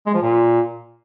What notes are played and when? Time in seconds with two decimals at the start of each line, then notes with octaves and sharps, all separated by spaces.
0.07 G#3
0.14 F3
0.22 A#2